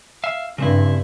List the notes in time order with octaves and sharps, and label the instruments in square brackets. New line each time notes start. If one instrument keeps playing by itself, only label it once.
[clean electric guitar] E5 F5
[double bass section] G2 [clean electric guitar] C#3 C4 E4